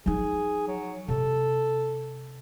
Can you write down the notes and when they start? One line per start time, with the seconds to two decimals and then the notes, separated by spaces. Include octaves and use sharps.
0.06 F3 D#4 G#4
0.68 F#3
1.08 C3 A4